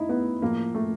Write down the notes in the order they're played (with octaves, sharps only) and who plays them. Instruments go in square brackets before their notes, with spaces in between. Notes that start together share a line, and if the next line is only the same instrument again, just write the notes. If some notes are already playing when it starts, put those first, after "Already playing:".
Already playing: [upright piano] A2 D#4 E4
B3
A2 F3 A#3
A3